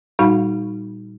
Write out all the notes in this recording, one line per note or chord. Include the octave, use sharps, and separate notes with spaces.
A#2 G3 D#4 F#4 F5 B5